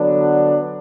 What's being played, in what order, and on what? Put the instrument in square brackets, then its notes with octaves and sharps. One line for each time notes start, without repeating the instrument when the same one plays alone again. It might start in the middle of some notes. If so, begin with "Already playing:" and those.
Already playing: [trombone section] D3 F#3 B3 D4